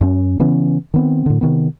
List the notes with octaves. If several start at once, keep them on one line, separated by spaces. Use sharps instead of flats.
F#2 C#4
C#3 E3 B3 C#4
D#3 B3 C4
A2 D3
C3 D#3 B3